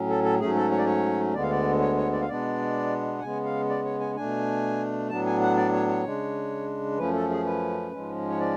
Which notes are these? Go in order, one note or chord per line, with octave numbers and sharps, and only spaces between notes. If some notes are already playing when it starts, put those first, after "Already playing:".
Already playing: A2 F#3 C#4
A4
A4
G#2 F#3 A3 C#4 G#4
A4
C#5
D5
C#5
D2 D3 G#3 B3 D5
F5
D5
C#5
C#5
D5
F5
B2 G#3 B3 D4 D5
F#5
C#3 G#3 B3 G#5
F5
D5
C#5
G#5
B2 A3 D4 G#5
A2 F#3 B3 D4 A5
G#5
F#5
D5
C#5
C#5
C#3 G#3 D4
F#2 F3 A3 C#4 B4
A4
G#4
B4
G#2 F3 G#3 C#4
C#5
D5